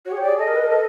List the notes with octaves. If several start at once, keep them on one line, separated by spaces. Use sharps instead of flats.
F#4 C#5
G#4
G4
D5
G#4
A4 D#5
A#4
B4
A#4
A4